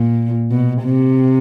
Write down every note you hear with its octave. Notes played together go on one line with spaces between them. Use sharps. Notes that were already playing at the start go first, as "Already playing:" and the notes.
Already playing: A#2
B2
C3